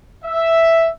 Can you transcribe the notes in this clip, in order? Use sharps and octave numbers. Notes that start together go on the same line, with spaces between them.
E5